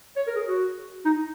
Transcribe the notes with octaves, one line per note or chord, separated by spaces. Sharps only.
C#5
A#4
G#4
F#4
D#4